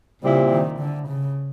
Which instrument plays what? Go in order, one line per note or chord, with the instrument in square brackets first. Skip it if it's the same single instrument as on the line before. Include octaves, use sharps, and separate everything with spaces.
[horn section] A#2 G3 C4 E4 G4 [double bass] C#3
[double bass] D#3
D3
C#3